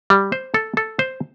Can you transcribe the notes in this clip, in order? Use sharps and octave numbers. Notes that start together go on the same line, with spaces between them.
G3
C5
A4
A4
C5